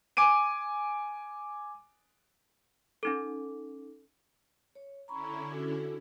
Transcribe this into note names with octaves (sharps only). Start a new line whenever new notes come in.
G#5 D6 D7 D#7
C#4 D#4 A4
C#5
D3 C#4 E4 A#5 B5 C#6
D4 F#4 A4